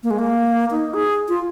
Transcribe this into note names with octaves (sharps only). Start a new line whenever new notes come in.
A#3
G#3
A#3
D#4
G#4
F4